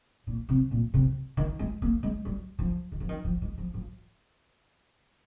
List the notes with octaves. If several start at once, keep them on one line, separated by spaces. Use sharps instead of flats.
A#2
C3
A#2
C3
D#3
G#3
A#3
G#3
G3
F3
D#3
F3
D#3
F3
G#3
F3
F3